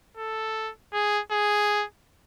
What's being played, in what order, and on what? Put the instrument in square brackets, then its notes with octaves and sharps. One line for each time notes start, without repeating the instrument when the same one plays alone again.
[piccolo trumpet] A4
G#4
G#4